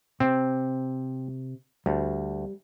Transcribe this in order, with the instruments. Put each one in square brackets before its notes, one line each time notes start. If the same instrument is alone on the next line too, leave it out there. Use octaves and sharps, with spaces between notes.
[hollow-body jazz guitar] C3 [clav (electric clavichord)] C4
[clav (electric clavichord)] D2 [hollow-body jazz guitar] G3